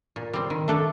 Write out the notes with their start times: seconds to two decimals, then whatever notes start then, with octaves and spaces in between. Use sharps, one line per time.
0.16 A#2
0.33 G3 C4
0.50 D#3
0.68 A3 D4 A4